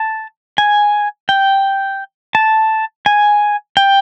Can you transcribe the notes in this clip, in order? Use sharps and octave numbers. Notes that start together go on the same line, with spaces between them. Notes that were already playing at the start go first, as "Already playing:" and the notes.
Already playing: A5
G#5
G5
A5
G#5
G5